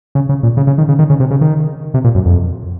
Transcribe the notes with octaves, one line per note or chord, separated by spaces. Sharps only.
C#3
C#3
A#2
C#3
C#3
D#3
C#3
D#3
C#3
C3
C#3
D#3
C3
A#2
F#2
F2